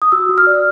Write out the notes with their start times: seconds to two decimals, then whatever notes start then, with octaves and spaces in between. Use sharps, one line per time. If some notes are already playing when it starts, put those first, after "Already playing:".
0.02 D#6
0.12 F#4 E6
0.29 F#4
0.38 F6
0.47 D5